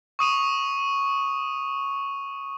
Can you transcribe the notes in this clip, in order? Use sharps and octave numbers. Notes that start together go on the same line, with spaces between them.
C#6 D#6 D#7 F7